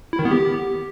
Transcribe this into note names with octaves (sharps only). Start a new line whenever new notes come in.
E4
D#3
B3
G4